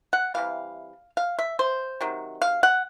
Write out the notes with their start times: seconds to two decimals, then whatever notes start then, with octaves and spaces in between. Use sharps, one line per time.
0.13 F#5
0.34 C3 E3 G3 F5
1.17 F5
1.39 E5
1.59 C5
2.01 C3 D#3 F#3
2.42 F5
2.63 F#5